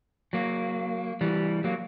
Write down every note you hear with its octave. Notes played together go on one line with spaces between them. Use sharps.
F#3 A#3
E3 G3
F#3 A#3